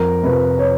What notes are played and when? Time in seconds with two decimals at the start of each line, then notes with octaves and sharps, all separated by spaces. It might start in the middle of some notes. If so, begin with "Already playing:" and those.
Already playing: F2 A#4
0.23 C3 F3 B4
0.59 C#5